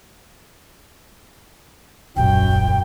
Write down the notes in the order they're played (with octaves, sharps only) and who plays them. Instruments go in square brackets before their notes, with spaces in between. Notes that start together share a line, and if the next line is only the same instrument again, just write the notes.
[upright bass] D#1 A1 [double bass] F#2 [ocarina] G5